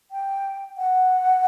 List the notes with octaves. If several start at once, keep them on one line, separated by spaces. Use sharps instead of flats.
G5
F#5